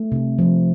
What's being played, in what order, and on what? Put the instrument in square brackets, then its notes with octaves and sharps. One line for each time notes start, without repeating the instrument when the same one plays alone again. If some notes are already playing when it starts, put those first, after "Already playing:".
Already playing: [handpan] A3
C3
F3